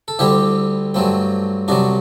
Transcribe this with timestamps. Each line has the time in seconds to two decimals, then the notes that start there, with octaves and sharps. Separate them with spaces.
0.08 A4
0.19 D2 D3 G3 C4 E4 G4
0.94 G2 F#3 A3 C4
1.68 C2 C3 F#3 D4 F#4